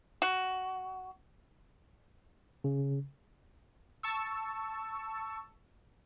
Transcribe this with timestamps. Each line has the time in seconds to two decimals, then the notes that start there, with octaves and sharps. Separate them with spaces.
0.22 F#4
2.64 C#3
4.03 A5 C#6 E6